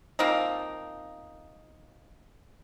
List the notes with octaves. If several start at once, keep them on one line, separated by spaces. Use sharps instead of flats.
F3 A#3 C4 D#4